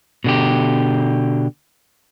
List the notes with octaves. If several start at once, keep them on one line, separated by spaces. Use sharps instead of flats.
B2 D3 G4